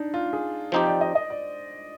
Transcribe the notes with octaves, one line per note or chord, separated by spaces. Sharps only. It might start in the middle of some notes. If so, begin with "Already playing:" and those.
Already playing: D4 D#4
F4
G#4
F3 C4 D#4 G4 C5
D5
D#5
D#5
D5